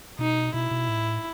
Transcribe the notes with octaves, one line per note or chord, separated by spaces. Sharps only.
B2 D#4
B2 E4
B2
A2